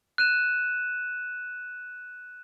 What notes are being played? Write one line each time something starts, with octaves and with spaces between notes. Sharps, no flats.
F#6 D#7 E7